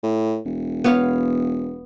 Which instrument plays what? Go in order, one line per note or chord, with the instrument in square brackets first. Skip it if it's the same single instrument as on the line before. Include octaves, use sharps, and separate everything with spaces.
[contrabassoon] A2
E1
[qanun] B3 C#5 F5